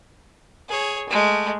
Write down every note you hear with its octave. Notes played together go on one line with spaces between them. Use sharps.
G#4 C#5
G#3 A3